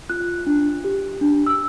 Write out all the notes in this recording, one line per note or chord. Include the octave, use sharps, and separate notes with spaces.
F4 F#6
D4
G4
D4
E6